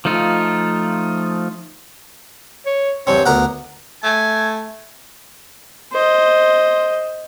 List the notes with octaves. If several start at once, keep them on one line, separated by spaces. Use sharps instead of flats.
F3 A3 D#4 F4
C#5
E2 G2 C4 C#5
D2 B3 A#4 F#5
A3 G#5
C5 D#5